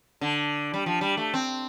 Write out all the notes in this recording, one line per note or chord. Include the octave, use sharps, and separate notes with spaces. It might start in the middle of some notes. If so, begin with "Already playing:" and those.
D3
G3
F3
G3
A3
C4